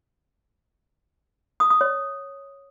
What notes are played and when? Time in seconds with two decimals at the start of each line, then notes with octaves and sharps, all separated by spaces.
1.60 D#6
1.70 D#6
1.81 C#5